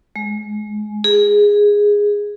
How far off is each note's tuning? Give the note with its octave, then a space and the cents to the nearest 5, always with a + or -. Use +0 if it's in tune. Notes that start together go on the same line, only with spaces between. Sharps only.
G#3 +25
G#4 -10